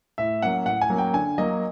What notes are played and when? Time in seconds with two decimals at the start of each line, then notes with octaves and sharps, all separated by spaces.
0.18 A2 E5
0.42 F#3 A#3 C#4 F#5
0.66 A2 F#5
0.81 G#5
0.90 F#3 A#3 C#4
0.98 G5
1.14 D3 G#5
1.38 F#3 A#3 D#5